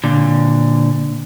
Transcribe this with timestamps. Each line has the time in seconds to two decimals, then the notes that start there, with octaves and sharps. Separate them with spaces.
0.04 A#2 D3